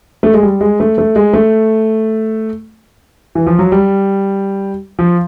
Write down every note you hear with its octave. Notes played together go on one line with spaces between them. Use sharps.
A3
G#3
G3
G#3
A3
A3
G#3
A3
E3
F3
F#3
G3
F3